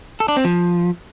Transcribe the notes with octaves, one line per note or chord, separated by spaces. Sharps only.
A4
D4
C4
F3